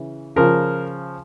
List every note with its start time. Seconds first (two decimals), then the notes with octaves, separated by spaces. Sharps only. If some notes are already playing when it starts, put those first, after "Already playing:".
Already playing: C#3 E3
0.36 C#3 F3 A#4